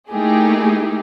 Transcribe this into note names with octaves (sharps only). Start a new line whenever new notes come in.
A3 A#3 D#4 E4 G4 G#4